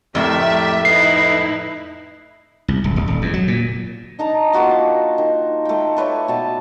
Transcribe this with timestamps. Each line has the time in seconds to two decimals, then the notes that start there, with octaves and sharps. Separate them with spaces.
0.15 F2 A2 A3 G4 A#4 D5 E5
0.85 D#4 E4 B4 E5 C7
2.68 C2
2.84 D1
2.96 D1
3.08 D#1
3.22 E2
3.34 F#3
3.48 A#2
4.19 D4 D#4 A5 A#5
4.53 A#3 F4 F#4 A5
5.18 D#3
5.65 A3 G5
5.97 A4 B4 C#5 D5
6.28 B2 A5